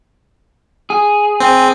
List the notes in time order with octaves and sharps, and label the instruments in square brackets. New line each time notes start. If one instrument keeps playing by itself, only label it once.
[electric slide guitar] G#4
[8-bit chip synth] C4